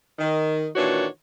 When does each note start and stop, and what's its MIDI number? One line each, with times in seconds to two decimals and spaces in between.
0.19 0.66 51
0.75 1.05 46
0.75 1.05 51
0.75 1.05 52
0.75 1.05 62
0.75 1.05 66
0.75 1.05 73